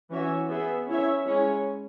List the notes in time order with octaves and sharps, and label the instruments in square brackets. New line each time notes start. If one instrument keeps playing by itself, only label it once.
[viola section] E3 C#4 F#4 C#5 E5
B3 G#4 E5
C#4 E4 C#5 E5
G#3 C#4 E4 C#5